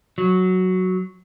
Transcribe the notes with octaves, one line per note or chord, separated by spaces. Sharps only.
F#3